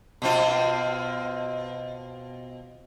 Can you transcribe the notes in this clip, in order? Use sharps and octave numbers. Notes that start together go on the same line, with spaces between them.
B2 C4 F4